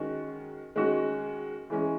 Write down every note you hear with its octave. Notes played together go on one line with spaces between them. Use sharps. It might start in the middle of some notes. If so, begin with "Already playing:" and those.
Already playing: D#3 G#3 C#4 F#4
D#3 G#3 C#4 F#4
E3 G#3 C#4